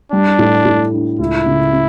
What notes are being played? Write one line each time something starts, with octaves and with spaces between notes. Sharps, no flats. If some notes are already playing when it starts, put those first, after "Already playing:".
G3 D4
A2
A2
D4
C#2 E4
C#3
C#4